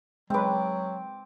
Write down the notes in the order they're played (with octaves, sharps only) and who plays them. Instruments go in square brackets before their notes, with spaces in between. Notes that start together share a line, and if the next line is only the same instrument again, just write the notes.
[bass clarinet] F#3 [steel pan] G#3 B4 [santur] C4 D6